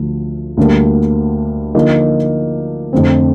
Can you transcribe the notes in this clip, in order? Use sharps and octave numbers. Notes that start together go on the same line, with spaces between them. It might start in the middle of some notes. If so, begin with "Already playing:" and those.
Already playing: D2 D3 F3
D2 D3 G3 A#3
D3 F3 A#3 D#4
F2 D3 A3 C4